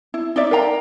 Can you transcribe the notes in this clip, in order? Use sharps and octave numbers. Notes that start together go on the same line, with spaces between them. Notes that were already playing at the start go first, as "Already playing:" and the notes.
E4
D#4 C#5 D5 E5
A#4 F5 G5 A#5